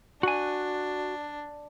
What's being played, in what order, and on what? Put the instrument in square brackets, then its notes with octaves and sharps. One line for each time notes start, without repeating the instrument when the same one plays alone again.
[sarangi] D4 [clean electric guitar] F#4 G#5